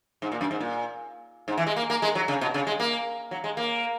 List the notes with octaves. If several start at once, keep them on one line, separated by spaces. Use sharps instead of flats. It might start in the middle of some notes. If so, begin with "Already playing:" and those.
G#2
A#2
F#2
G#2
A#2
G#2
E3
G#3
A#3
A#3
G#3
F#3
C#3
B2
C#3
G#3
A#3
F#3
G#3
A#3